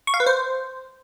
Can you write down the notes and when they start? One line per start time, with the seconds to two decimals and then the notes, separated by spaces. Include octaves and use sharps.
0.07 C#6
0.14 F5
0.20 B4
0.26 C5